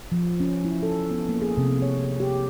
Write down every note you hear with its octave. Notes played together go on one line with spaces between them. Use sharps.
F3
C#4
E4
A4
B3
A#3
G#4
C3
C#5
G4